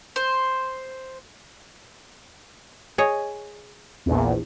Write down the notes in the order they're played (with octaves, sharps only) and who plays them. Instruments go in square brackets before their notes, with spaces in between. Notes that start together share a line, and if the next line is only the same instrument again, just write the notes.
[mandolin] C5
[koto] G#4 C#5 D#5
[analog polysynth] A#1 E2